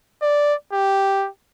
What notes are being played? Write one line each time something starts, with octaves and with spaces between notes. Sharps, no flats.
D5
G4